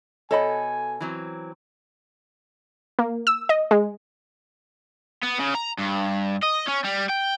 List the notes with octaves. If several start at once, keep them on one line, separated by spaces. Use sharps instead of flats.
B2 A4 C#5 D#5 G#5 B5
E3 F#3 C4
A#3
E6
D#5
G#3
B3
C#3
A#5
G2
D#5
C#4
G3
G5